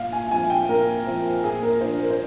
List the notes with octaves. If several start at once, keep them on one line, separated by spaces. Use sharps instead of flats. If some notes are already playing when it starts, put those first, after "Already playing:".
Already playing: A#2 F5
G#5
F3 C4 G#5
G5
A#2 A#4
F3 C4
A#2 G#4
A#4
F3 A#3 D4 C5
A#4
C5